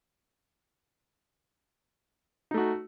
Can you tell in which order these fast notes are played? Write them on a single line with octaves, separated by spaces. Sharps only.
D#4 A3 F#4